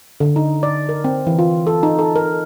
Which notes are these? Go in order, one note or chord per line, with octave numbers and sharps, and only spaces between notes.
D3
D#4
D5
A#4
C4
E3
F4
A4
D#4
A4
A#4